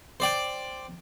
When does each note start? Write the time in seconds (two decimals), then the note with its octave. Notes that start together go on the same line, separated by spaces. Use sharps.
0.20 C5 D5 G5